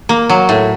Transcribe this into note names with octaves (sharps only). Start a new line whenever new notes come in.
A#3
F#3
A2